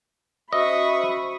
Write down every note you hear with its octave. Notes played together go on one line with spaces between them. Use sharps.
C#4 F#4 C5 D#5 E5 B5 C#6 D#6